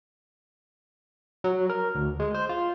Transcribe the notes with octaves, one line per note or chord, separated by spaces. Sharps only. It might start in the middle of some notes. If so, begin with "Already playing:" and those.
F#3
A#4
D2
G#3
C5
F4